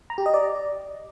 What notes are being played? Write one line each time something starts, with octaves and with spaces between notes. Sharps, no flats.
A#5
G4
D#5
D5